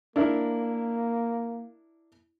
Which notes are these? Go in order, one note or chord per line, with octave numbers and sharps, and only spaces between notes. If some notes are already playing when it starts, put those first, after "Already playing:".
A#3 D4 E4 A#4